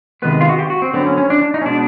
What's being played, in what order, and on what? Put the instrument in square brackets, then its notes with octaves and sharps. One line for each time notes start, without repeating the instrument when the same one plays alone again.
[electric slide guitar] C3 D#3 G#3 B3 B4
F4
F#4
G4
F#4
C4
D3 F#3 B3 C4
C#4
C#4
D4
D4
D#4
C#4
B2 G#3 B3 D4